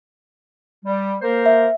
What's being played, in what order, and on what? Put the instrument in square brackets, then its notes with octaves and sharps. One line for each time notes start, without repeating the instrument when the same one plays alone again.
[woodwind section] G3
A#3 A#4 C5
[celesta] E5